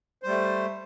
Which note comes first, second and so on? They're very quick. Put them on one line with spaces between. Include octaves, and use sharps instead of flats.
C5 G3 A3